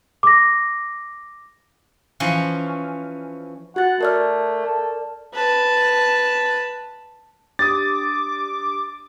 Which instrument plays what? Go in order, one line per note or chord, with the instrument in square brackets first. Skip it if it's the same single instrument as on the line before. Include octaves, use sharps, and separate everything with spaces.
[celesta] D6 A#6
[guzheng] E3 F3 C#4
[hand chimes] F#4 A6 [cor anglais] F#5
[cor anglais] A3 [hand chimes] A#4 D5 F6
[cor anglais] A4
[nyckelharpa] B4 A5
[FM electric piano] D4 G4 [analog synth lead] D6 [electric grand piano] D#6 A6